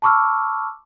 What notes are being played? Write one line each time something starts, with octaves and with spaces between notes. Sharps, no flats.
A5 B5 C#6 D6 E6 F6